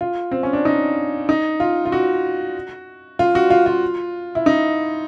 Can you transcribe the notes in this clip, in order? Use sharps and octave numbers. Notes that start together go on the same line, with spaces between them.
F4
C4
C#4
D4
D#4
D#4
F4
F4
F#4
F4
F#4
F4
F4
E4
D#4